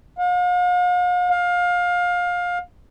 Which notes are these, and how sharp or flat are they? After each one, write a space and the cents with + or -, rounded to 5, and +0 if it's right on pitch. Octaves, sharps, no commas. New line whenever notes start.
F5 +45
F5 +25